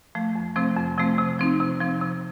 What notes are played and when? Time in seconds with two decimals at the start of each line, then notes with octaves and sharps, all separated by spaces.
0.15 F3 A3
0.36 F2
0.56 C3 F3 A3 C4
0.77 F2
0.97 C3 F3 A3 C4
1.18 C3
1.39 F3 C4 D#4
1.60 C3
1.81 F3 C4 D#4
2.01 C3